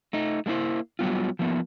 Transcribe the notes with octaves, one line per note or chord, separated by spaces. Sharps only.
A3 D#4
G#3 A#3 D4 E4 C5
F#3 G3 B3 F4
F3 A#3 B3